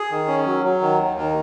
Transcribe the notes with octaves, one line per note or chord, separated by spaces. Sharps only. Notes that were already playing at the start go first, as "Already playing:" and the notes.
Already playing: G#4
D#3
C#4
F#3
F#3
D#3
D#2
D#3